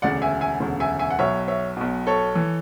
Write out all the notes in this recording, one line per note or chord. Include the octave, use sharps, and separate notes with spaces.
E1 D2 C#3 D5 F#5
E5 G#5
E5 G#5
E1 D2 C#3
E5 G#5
E5 G#5
F#5
B1 B2 C#5 E5
C#5 E5
B1 B2
A4 C#5
E3